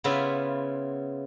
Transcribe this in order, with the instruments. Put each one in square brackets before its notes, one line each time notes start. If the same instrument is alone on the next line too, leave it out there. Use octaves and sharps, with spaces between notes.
[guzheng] C#3 B3 E4 F4